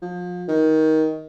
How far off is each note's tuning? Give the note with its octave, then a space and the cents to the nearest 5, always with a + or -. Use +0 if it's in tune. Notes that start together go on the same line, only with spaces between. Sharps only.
F3 +35
D#3 +20